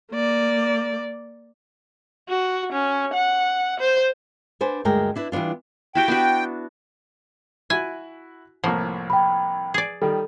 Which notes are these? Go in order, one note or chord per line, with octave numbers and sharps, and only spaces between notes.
A#3 D5
F#4
C#4
F#5
C5
D4 B4 C5 F#5 G#5
D2 G2 G#3 A#4 G5
D4 E4 B4
E3 G3 B3 D4 F4
E4 F#4 G4 G5
B3 D4 F#4
E4 F#4 G#5
C2 A2 F3 A#3
G5 B5
G#4 D5
D#3 G3 A4